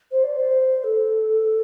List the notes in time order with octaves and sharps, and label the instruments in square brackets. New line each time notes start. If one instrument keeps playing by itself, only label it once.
[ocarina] C5
D5
C5
A4